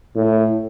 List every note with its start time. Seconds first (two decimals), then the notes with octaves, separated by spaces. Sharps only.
0.16 A2